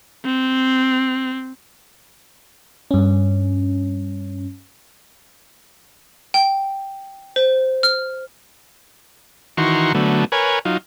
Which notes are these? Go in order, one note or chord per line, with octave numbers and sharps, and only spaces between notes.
C4
G2 C#4
G5
C5
F6
D#3 E3 F#4 A#5 C6 C#6
D3 F#3 A3 B3
A#4 B4 C#5 G#5
F#3 D#4 F4